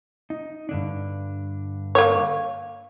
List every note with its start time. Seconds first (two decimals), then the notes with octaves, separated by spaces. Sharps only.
0.30 D#4
0.69 G2 D3 D4
1.95 A#3 C#5